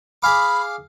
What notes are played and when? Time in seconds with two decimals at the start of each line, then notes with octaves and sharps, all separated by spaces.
0.23 G#4 F5 B5 D6